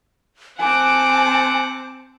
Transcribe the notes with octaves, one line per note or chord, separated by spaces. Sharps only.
C4 F#5 G#5 A5 D6